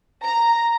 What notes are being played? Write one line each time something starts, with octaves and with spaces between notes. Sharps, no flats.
A#5